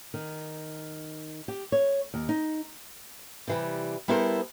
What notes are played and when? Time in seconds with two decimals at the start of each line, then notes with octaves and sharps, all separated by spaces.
0.14 D#3
1.48 G4
1.72 C#5
2.14 D#2
2.29 D#4
3.48 C3 E3 G3
4.08 G3 B3 E4 A4 A#4 C5